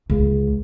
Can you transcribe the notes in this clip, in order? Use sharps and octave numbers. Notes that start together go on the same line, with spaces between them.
C#2